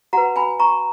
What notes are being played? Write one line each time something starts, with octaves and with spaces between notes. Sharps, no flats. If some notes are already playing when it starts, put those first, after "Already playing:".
F#4 B4 F#5 A#5
G#5 B5
A#5 C#6